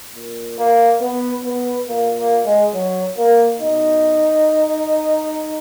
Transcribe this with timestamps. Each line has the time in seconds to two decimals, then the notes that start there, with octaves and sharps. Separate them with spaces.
0.15 A#2
0.57 A#3
1.01 B3
1.44 B3
1.88 A#2 A#3
2.17 A#3
2.45 G#3
2.74 F#3
3.17 A#3
3.60 B2 D#4